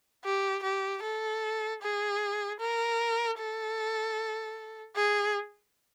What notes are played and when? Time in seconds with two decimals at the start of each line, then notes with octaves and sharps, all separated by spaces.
0.24 G4
0.63 G4
1.03 A4
1.82 G#4
2.60 A#4
3.39 A4
4.96 G#4